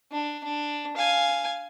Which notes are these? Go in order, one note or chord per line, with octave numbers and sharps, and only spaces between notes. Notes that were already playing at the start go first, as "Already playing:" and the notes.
D4
D4
F5 G#5